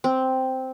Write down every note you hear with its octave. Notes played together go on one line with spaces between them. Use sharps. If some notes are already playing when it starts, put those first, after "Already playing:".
C4